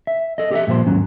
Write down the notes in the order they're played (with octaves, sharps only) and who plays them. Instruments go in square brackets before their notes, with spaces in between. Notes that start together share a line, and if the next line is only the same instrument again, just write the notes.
[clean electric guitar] E5
A4 D#5
G4 A4 D#5 E5
G2 A#2 F3 C5 C6
D#2 G#2 F#3 C#4